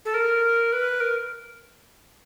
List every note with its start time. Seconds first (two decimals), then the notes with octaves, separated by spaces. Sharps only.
0.05 A4
0.14 A#4
0.73 B4
1.00 A#4